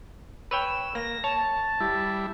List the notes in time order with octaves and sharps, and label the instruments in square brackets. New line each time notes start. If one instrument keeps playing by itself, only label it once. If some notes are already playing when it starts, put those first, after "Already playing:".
[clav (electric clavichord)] B4 C#5 G5 [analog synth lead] E6
[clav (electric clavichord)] A#3 [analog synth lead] A#6
[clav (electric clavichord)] C#5 [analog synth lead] A5
[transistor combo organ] G3 E4